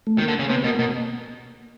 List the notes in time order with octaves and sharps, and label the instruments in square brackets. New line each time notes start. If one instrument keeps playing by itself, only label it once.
[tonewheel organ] A3
[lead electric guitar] D#3
[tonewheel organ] A#3
[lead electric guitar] D3
C#3
[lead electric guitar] C3 [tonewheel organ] B3
[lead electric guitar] B2 [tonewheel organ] A#3
[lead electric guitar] B2 [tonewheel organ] A#3